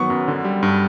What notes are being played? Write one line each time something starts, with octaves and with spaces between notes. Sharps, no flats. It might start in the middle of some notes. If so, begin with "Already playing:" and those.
Already playing: D#3 F#3 B3 C#6
F#2
D3
G3
G2